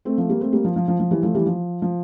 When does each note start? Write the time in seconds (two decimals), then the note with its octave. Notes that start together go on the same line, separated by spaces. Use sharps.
0.05 A3 C4
0.17 F3 A3
0.29 G3 A#3
0.41 A3 C4
0.53 G3 A#3
0.65 F3
0.76 F3
0.88 F3
1.00 F3
1.11 E3 G3
1.23 F3 A3
1.35 E3 G3
1.46 F3
1.82 F3